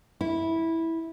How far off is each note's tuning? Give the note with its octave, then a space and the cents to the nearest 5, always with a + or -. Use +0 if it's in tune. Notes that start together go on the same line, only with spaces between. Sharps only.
E4 -10